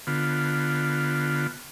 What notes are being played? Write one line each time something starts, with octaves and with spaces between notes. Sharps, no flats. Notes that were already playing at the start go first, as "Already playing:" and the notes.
D3 B3 F4